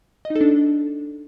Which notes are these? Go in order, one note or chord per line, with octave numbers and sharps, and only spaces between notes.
D#5
D#4
A4
D4